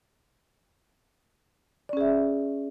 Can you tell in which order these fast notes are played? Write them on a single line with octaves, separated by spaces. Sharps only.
D5 C#4 G#4 E5